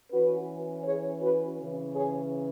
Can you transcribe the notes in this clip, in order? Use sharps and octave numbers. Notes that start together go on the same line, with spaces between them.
E3 C#4 F#4 B4
G#4 C#5
F#4 B4
C#3 E3 C#4
G#4 C#5